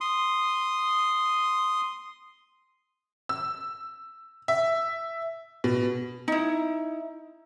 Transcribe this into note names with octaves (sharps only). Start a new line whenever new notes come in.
C6 D#6
E6
E5
B2
D#4 E4